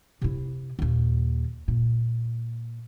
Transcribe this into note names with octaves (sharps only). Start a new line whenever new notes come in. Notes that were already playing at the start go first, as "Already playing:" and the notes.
C3 E4
D#2 A#2
A#2